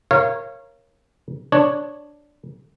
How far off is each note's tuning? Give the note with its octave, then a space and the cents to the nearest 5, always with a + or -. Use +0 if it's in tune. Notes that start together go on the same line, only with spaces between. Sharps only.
A#4 +0 C#5 -20 F5 -30
D4 +0 C#5 -5